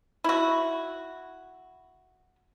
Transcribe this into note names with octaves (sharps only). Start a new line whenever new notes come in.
E4 F#4